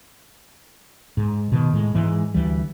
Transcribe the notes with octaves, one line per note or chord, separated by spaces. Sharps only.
G#2
B2 D#3
A2 G#3
G#2 E3 G#3
D2 E3 G3